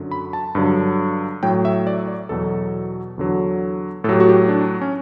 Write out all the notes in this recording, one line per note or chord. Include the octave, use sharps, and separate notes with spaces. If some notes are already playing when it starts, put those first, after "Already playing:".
Already playing: F#2 D3 F#3
B5
A5
G2 D3 F#3
A2 F#3 G5
E5
D5
D5
E2 B2 F#3 A4
E2 D3 F#3
A2 F#3 G4 A4
F#4
G4
D4
C#4